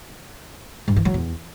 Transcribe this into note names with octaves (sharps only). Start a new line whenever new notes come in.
G2
E3
F#3
E2